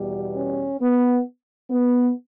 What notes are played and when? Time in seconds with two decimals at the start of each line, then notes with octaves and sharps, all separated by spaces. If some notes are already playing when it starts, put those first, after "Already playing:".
Already playing: E2 B2 G3
0.35 C#4
0.80 B3
1.70 B3